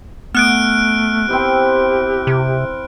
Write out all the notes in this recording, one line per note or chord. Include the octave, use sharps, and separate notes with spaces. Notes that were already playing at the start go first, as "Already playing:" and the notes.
A3 B3 F6 F#6 D7
C4 E4 G4 C5
C3